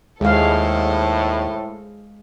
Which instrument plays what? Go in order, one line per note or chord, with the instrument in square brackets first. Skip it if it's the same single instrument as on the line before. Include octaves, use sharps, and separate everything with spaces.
[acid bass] D#2 [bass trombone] A2 [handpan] G#3 G#4 F5 [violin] A4 C5